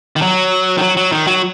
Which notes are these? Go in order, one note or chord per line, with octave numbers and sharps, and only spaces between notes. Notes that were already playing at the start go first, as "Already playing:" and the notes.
D#3
F#3
D#3
F#3
F#3
D#3
F#3